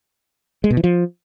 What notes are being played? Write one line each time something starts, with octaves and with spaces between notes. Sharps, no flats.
G#3
B2
E3
F3